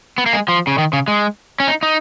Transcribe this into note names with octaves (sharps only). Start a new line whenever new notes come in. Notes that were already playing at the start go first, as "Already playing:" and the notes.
B3
A#3
G#3
F3
C#3
D#3
C#3
G#3
C#4
D#4
D#4